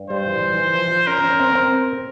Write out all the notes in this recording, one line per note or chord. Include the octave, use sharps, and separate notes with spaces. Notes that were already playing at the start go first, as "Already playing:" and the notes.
Already playing: G2
G3 C5
E3
E3
E3
F3
F3
C#4 A#4
C#4
C4
C4